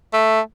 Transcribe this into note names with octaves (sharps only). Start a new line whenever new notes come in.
A3